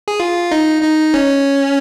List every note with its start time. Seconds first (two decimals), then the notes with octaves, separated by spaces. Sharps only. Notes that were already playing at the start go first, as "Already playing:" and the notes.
0.08 G#4
0.20 F4
0.51 D#4
0.83 D#4
1.14 C#4